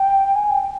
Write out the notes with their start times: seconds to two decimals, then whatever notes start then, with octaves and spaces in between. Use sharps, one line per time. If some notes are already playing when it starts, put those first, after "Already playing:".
Already playing: G5
0.36 G#5
0.51 G5